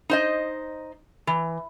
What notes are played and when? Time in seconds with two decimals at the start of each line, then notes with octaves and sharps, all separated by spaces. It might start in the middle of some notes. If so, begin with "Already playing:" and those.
0.10 D#4 C5 D#5
1.27 E3